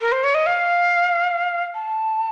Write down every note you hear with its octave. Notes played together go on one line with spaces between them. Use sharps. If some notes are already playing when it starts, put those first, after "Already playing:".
A#4
C5
C#5
D#5
F5
A5